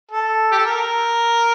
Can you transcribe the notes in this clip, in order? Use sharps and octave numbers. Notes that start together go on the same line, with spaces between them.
A4
G4
A4
A#4